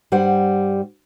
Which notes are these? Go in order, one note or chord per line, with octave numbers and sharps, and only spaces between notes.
G2 G3 C5 F#5